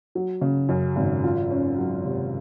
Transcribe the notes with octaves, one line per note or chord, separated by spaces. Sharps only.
F#3
C#3
F#2
G#1
F4
C#4
F#3
C3